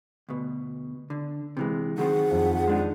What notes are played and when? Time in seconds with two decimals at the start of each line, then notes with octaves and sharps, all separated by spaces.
0.29 D2 B2
1.10 D3
1.57 C3 E3 G#3
1.98 D#3 F#3 C4 G#4 F#5
2.31 F2
2.68 G#3 D4 D#4